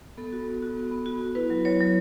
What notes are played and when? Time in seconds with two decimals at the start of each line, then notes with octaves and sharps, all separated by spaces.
0.17 B3 A4
0.33 F#4
0.48 B3
0.62 F#4
0.77 B3
0.91 B3
1.06 F#4
1.21 B3
1.35 E4 B4
1.50 F#3
1.65 F#3 C#5
1.80 F#3